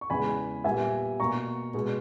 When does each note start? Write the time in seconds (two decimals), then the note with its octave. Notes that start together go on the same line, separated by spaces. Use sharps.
0.01 C#6
0.10 E2 C#3 E3 G#3 G#5 B5
0.64 A#2 G3 B3 E5 G#5
1.20 B2 A#3 A#5 C#6
1.74 B2 G#3 B3